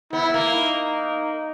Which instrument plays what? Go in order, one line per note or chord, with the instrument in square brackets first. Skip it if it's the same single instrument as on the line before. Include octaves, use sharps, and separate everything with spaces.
[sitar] B3 [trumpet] E4
[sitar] B3
A#3
[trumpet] D#4